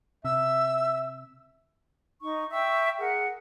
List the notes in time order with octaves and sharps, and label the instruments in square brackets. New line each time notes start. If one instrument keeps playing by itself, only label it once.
[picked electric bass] C3 [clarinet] E5 [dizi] E6
[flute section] D#4 C#6
E5 G5 C#6 E6
G#4 A#4 F#5